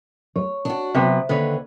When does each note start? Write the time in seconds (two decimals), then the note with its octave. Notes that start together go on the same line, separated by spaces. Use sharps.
0.36 C#5
0.65 D4 F#4
0.94 C3 F#3 B3 C5 E5
1.29 D#2 D3 B4 C#5